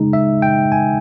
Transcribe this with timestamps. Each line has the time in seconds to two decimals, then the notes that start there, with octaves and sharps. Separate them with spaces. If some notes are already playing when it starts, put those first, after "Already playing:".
Already playing: C#3 G#3 D#4
0.13 E5
0.42 G5
0.72 G#5